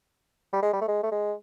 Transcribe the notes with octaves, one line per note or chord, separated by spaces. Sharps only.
G3
G#3
G3
A3
G#3
A3
G#3